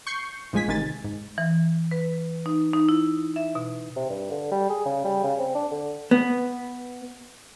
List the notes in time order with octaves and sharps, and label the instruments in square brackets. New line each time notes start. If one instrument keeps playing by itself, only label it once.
[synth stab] C#6 G6 C7 C#7
A#1 F3 G#3 G#5 B6
A1 C3 D#3 G#5 A6
G#2
[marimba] E3
B4
D#4
D#4
E4
E5
B2
[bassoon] C3
G2
D3
G3
G#4
C#3
G3
C#3
C4
D4
D3
[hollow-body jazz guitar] B3